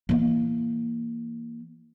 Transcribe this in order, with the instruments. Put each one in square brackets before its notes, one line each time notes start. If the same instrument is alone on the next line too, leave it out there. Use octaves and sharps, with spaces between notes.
[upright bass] E3 A#3